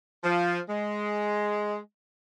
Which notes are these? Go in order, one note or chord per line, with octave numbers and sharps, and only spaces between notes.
F3
G#3